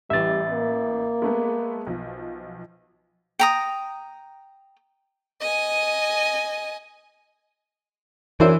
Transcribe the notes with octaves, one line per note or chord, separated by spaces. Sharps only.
A1 E3 G3 E5 A6
A#3
G#3 A3 B3
B1 F3
G5 A#5 D#6
D#5 G#5
F#2 E3 D4 E4 C5